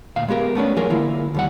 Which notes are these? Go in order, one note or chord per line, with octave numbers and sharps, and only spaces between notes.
D2 A#2 F5
G#3 B3 G4 A#4
A3 B3 C#4 D4
E3 F#3 F4 G#4 A#4
D3 A#3 E4 F4
D#2 G3 F#5